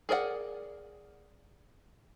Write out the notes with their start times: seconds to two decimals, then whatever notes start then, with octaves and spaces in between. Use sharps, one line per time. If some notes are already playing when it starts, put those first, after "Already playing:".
0.09 G#4 A#4 D5 D#5 F#5